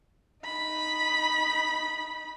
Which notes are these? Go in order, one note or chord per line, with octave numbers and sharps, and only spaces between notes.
D#4 B5